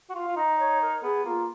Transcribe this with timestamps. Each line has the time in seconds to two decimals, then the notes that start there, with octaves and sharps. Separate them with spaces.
0.09 F#4
0.14 F4 F5
0.27 F4
0.36 D#4 D#5
0.59 C#5
0.81 A#4
1.03 B3 G#4
1.24 A#3 F4